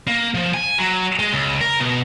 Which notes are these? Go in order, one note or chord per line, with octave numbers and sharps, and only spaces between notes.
A#3
F3
G#5
F#3
G#3
C#2
A#4
B2